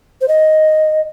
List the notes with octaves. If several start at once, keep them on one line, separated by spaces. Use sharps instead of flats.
C5
D#5